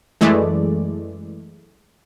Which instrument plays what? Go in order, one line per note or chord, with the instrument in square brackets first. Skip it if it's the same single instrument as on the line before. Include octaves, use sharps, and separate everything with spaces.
[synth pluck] F#2 E3 G#3 A3 D5